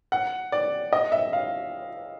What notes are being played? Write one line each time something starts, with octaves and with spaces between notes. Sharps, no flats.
F#5
D5
D#5
E5
F5